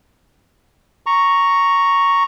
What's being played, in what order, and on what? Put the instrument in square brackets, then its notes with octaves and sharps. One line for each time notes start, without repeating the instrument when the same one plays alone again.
[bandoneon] A#5 C#6